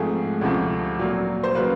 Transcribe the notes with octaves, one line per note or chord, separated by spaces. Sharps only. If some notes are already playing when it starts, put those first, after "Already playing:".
Already playing: G#2 F3 A3 C4 G#4
D2 C3 F3 A3
A#2 F#3 A#3
C5
C#3 F#3 A#3 B4